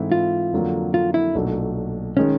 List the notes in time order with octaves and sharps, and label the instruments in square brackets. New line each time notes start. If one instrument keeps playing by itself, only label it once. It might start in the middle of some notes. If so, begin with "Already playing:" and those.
Already playing: [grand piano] G#2 E3 A3 C4 E4
[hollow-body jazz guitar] F4
[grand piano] F2 D3 F#3 A#3 D4
[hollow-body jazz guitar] F4
E4
[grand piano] B1 A#2 F#3 A3 D4
[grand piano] D#3 G#3 [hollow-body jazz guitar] C#4